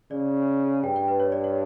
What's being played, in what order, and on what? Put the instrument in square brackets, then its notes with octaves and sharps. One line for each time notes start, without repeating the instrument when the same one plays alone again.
[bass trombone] C#3 [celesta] D5
[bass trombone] G2 [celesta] G5
[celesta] G5
B4
C#5
D5
C#5